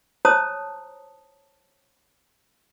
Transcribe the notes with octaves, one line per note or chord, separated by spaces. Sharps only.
C5 C#5 A5 A#5 D#6 E6